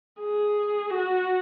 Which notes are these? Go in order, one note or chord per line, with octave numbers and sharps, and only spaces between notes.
G#4
F#4